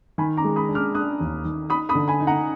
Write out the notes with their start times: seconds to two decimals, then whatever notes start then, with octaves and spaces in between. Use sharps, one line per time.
0.18 D#3 G#5 B5
0.37 A#5 D6
0.44 G#3
0.56 B5 D#6
0.69 D4
0.75 D6 F6
0.94 D4 D#6 F#6
1.20 D#2
1.45 D#3
1.70 D#4 B5 D#6
1.89 B5 D#6
1.95 D3
2.08 G#5 B5
2.20 D#4
2.27 F#5 A#5